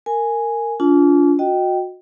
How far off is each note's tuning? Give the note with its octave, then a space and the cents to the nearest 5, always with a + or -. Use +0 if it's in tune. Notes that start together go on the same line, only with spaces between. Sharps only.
A#4 -20 G#5 +0
D4 -40 F4 +0 G#5 +45
F#4 -25 D#5 +0 G5 -10